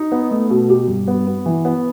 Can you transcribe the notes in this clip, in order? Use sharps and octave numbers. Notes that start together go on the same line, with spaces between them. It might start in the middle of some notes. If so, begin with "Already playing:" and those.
Already playing: D#4
B3
A3
B2
G4
G2
B3
B3
E3
B3